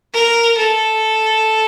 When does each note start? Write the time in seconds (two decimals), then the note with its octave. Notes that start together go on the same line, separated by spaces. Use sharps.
0.14 A#4
0.58 A4